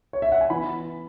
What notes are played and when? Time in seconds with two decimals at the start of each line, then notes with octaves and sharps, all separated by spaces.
0.13 C#5
0.22 E5
0.32 F#5
0.41 G#5
0.50 E3 B3 B5